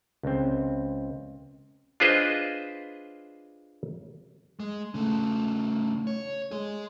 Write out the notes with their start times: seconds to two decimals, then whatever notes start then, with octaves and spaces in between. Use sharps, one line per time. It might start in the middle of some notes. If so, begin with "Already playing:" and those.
0.23 C#2 C4
2.00 D4 F4 G#4 B4 C5 D#5
4.60 G#3
4.94 C#3 A3
6.07 C#5
6.51 G#3 G#4